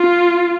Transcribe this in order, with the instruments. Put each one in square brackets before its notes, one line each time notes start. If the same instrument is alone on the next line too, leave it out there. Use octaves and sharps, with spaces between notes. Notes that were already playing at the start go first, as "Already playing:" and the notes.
Already playing: [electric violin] F4